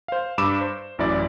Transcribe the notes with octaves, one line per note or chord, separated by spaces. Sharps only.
C5 F5
G2 B5 D6 E6 E7
C5
A1 F#2 E4 D5